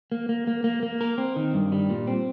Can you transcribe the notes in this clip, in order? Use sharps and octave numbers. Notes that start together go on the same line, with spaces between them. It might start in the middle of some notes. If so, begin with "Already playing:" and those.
A#3
A#3
A#3
A#3
A#3
A#4
C4
D#3
G2
G3
A#2
C4